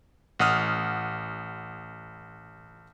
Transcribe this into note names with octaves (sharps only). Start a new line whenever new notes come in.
A1 F#5 D#6 F6